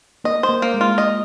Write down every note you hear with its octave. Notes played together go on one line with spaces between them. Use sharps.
A#3 D#5
C5
A#3
A#3
G#3
F4
D#5